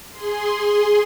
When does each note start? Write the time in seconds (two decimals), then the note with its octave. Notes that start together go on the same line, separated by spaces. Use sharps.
0.10 G#4 C6